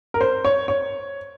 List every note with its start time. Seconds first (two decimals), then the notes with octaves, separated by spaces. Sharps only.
0.14 A#4
0.21 C5
0.45 C#5
0.68 C#5